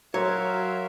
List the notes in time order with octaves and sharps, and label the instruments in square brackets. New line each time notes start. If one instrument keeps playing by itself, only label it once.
[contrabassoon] F#3 [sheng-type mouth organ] A#4 E5 F5 [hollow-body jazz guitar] C#5 [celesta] A#5 C6